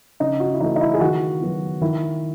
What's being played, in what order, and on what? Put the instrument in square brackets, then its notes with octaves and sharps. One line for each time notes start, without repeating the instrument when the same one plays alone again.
[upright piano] C#3 D#4
F#4
E4
E3 A3 D#4
D#4
E4
G#4
D#3 F#4
F#3 B3
D#3 E4